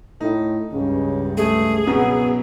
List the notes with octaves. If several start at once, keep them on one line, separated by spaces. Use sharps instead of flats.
A2 D#4
C#2 G2 C#3
A3 G#4
F#2 B2 F#3 B3